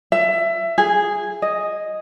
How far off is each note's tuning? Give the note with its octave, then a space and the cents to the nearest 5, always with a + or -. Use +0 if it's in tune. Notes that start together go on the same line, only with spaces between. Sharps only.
E5 +20
G#4 -5
D#5 +0